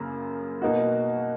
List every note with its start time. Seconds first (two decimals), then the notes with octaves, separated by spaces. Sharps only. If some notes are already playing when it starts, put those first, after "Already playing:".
Already playing: F#2 C#3 A#3
0.62 B2 A#3 D#4 F#4